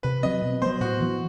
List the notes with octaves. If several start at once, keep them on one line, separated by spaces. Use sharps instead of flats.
C3 B4
F#3 C4 D#5
B2
F#3 B3 C5
A2 F#4
E3 B3